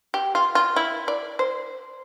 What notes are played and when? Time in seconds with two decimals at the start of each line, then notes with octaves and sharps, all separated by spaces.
0.14 G4
0.35 F4
0.55 F4
0.76 E4
1.08 D5
1.39 C5